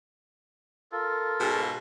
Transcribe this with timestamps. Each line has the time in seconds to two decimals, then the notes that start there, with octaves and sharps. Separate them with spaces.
0.92 F4 A4 A#4
1.38 G#2 B2